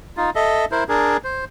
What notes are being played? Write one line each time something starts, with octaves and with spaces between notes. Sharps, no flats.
D#4 F4
A4 D#5 E5
E4 A#4 C5
D4 G#4 A#4
C5